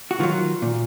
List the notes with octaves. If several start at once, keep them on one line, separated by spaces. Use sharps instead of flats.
F#4
D#3 F3 F#3 F4
A#2